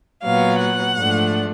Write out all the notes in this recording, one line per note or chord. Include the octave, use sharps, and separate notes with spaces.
A#2 F#3 B3 F5
F#5
G#2 F3 A3 D4